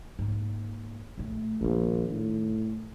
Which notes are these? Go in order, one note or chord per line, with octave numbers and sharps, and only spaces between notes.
G#2 A#3
A#1 A3
A#1 F2 D#3
A2